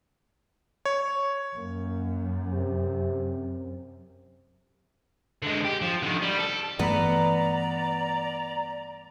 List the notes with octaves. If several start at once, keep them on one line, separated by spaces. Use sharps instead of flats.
C#5
F#2 A#3
C3
D3 G#3
G4
F3
D3 D#3
G3
A4
G2 E3 A3 B3 B4 D5 A#5